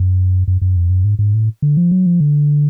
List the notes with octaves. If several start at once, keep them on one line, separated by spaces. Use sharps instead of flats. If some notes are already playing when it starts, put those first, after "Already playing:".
Already playing: F#2
F#2
F#2
F2
F#2
G#2
G#2
A2
D3
F3
F#3
F3
D3